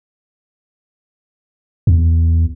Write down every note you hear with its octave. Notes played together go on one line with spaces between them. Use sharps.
E2